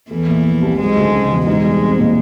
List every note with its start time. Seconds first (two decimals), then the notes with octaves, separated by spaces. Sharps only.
0.11 E2 E3 A3
0.28 A#2
0.45 F3
0.62 C2
0.79 G#2 F#3 G#3
0.96 D2
1.13 C#3
1.30 E1
1.47 G#2 G#3 D#4
1.64 G3
1.81 C4
1.98 A#2